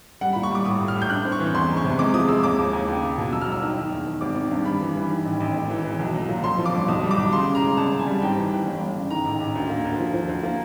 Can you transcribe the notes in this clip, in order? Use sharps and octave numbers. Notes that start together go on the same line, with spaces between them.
G3 F#5
B5
A#2
C#6
G3 D6
A2 D#6
A2
F6
A2
G6
G2 F#6
C4
C#6
E3
E2 C6
F#1
C#6
C3
G#3 D6
F3 D#6
G#3 E6
D#2 D6
D#2
D#2
C#2
C#2
B2
F#3 E6
F6
G1 E6
D#3
D#3
E2
D#3
G#1 D6
D#3
G2
G3 B5
E3
E3
D#3
A1
A1
E1
E3
E3
B1
F#3
A#2
F2 C6
F3
D6
G1
B1 D#6
G3
D6
B1
C#3 C6
C#3
A#5
G#3
C2 A5
C2
G#5
G3
G#2 G5
E3
E3
G1
G1
C#3
D#3 A#5
A1
A1
D2
A#3
D2
F3
F3
D2
A#3